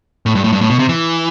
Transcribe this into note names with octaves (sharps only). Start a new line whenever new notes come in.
A2
G2
A2
G2
A2
B2
C3
E3